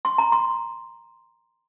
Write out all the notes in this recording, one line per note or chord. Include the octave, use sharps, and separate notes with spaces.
C6
A#5
C6